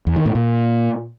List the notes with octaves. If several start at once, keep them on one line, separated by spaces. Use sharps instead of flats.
E2
D#3
A2
A#2